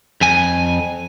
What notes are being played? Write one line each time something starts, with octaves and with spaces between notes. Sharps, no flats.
F2 G#5